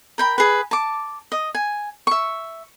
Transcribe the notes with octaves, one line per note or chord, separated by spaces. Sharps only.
A#4 G5 B5
G#4 B4
A5 D6
D#5
G#5
E5 C#6